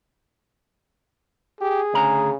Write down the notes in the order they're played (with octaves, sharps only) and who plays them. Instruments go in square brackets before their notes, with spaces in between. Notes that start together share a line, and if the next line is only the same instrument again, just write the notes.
[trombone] G4 [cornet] G#4
[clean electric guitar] D2 A#5 [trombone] C#3